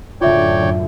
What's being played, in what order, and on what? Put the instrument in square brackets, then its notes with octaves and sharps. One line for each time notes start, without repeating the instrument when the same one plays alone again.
[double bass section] F#2 A2 D3 [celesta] F4 E5 [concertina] C#5 D5 G5